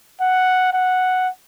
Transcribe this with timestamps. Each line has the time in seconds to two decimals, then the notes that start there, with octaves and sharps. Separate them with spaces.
0.21 F#5
0.73 F#5